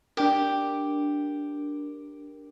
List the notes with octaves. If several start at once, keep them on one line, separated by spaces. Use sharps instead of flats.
D4 G4 A#4